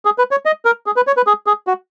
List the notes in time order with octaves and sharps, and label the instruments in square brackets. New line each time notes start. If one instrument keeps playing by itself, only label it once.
[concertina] G#4
B4
C#5
D#5
A#4
G#4
B4
C#5
B4
G#4
G#4
F#4